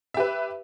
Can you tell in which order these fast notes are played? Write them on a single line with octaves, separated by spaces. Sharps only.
E5 G4 B4